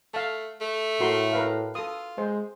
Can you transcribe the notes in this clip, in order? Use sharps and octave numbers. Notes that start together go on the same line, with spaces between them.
A3 F5 A5
A3
A2 F#4 A#4 C6
A#4 B4 F5
F4 A4 D#6
G#3 C5